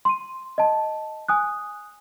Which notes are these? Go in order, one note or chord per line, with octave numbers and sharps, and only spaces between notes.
C6 D#7
D#5 A5
G#5 D#6 F#6